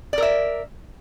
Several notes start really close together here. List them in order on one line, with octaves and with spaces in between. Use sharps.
D5 A#4 E5